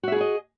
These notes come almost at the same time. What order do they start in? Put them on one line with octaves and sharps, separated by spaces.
F#4 E5 G#4 E4 D#5